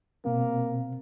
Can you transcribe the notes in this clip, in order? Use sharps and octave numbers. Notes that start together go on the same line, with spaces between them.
B2 A#3 C4